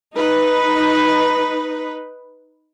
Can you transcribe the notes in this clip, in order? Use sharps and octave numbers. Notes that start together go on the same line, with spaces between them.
D#4 B4